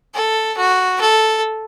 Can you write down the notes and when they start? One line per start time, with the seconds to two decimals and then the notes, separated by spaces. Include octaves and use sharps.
0.14 A4
0.57 F#4
1.01 A4